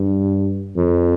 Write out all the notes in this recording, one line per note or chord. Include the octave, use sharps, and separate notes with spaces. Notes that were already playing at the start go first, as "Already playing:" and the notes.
Already playing: G2
F2